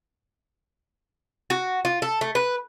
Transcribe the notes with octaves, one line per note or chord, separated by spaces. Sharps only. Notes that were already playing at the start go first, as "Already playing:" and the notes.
F#4
F4
A4
A3
B4